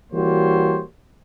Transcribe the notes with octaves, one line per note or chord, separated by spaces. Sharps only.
E3 G3 A#3 F#4 C5 C#5